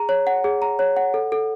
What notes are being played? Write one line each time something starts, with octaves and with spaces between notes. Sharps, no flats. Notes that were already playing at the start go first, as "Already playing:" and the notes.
Already playing: G#4 A#5
C#5
F#5
G#4
A#5
C#5
F#5
A4
A4